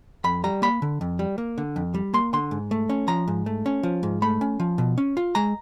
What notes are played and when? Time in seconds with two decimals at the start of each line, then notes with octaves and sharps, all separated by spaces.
0.24 F2 B5
0.44 G3 A#5
0.62 A#3 B5
0.82 D3
1.01 F2
1.19 G3
1.38 A#3
1.58 D3
1.76 F2
1.94 G3
2.14 A#3 C6
2.33 D3 C6
2.51 G#2
2.71 A3
2.89 C#4
3.08 F3 A#5
3.28 G#2
3.46 A3
3.66 C#4
3.83 F3
4.03 G#2
4.22 A3 B5
4.41 C#4
4.60 F3
4.78 B2
4.98 C#4
5.17 F4
5.35 G#3 A#5